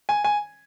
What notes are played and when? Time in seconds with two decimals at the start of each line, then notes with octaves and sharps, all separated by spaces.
0.09 G#5
0.24 G#5